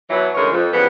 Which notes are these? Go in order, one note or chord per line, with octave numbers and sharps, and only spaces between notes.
B2 E3 F#3
D2 C#3 E3 G#3 A#4 C#5
F2
C#3 E3 F3 G3 B3